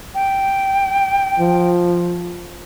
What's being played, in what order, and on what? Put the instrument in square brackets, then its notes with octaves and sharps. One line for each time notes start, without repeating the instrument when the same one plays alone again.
[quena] G5
[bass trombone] F3